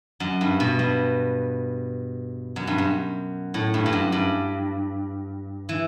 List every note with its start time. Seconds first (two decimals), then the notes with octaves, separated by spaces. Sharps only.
0.20 F#2
0.41 G2
0.60 B2
0.79 G2
2.56 F#2
2.67 G2
2.78 F#2
3.54 A2
3.74 G2
3.86 G2
3.93 F#2
4.12 G2
5.69 E3